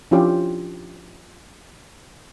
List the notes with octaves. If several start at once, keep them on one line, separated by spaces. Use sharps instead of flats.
F3 C#4 D4 E4 F4 G4